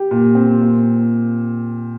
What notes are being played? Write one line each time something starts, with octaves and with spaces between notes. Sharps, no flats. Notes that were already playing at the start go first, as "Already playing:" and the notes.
Already playing: G4
A#2
C4
A#2